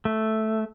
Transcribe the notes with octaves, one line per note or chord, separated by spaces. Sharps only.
A3